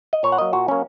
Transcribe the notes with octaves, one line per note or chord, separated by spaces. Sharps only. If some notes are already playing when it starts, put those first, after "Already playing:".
D#5
A#2 C#5
F#5
F#3 A#3 D#5
A#2 F#4
F#3 A#3 C#4